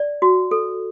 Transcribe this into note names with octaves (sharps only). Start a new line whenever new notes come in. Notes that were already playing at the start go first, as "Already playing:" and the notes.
Already playing: D5
F#4
A4